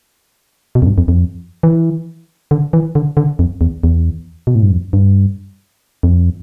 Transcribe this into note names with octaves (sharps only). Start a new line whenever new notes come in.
B2
F2
G2
F2
F2
E3
D3
E3
D3
D3
F2
E2
E2
B2
A2
G2
F2
G2
F2